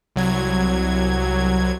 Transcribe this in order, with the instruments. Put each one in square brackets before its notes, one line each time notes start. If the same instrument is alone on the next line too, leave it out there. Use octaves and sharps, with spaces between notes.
[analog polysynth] C2 F#3 G#6